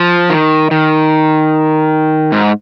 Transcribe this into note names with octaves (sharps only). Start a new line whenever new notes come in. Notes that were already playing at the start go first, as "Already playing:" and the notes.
Already playing: F3
D#3
D#3
G#2